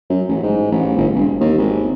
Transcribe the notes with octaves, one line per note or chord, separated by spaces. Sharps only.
F#2
A1
G#2
A1
G1
E1
D#2
G#1